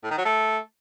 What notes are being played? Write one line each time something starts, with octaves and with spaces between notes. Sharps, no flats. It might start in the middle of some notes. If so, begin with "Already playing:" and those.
A2
D#3
F#3
A3